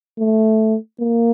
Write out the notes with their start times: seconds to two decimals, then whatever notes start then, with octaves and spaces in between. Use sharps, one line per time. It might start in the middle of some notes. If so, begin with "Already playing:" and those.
0.19 A3
1.00 A#3